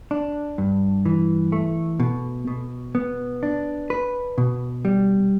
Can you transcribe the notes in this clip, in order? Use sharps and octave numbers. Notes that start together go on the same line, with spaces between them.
D4
G2
E3
A3
B2
B2
B3
D4
B4
B2
G3